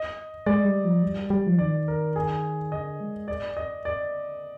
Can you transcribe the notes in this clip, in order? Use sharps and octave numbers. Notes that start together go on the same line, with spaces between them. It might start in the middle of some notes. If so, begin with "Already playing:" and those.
Already playing: D#5
G#3 D5
G3
F3
G3
G3
F3
D#3 D5
A#4
G#4
D3 D#5
G#3
D5
D#5
D5